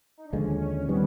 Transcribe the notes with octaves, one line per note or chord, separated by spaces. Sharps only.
D#4
D4
D#2 D3 F3 G#3 C#4
C#4
D#3 G3 B3 C4